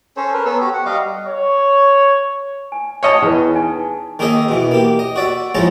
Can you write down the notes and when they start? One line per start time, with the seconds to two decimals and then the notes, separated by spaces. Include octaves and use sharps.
0.17 C#4 A4 C5 C#5
0.33 A#4 B4
0.45 B3 A4 C#5 E6
0.60 F#4 G4
0.74 F#5
0.86 G3 D#5 F5 D6
1.27 C#5
2.72 G#5
3.03 C#5 D#5 A5
3.22 E2 G#4 B4
3.55 D#4 G#5
4.19 D#3 A#3 D#4 G#4 D#5 E5
4.49 B2 E3
4.71 A#3 G4
4.99 D#5
5.16 F#4 D5 E5
5.55 A2 F3 G#3 A3 A5 A#5